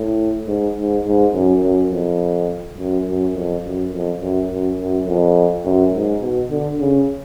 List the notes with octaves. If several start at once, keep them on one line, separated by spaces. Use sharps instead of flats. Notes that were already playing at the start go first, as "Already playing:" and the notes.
Already playing: A2
G#2
G#2
G#2
F#2
F#2
F2
F#2
F#2
F2
F#2
F2
F#2
F#2
F#2
F2
F#2
G#2
B2
D3
C#3